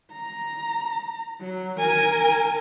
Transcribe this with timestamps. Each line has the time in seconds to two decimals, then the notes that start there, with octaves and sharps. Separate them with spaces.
0.12 A#5
1.41 F#3
1.79 A#4 G#5